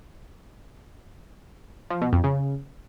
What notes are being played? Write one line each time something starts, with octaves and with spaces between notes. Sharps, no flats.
F3
B2
F2
C#3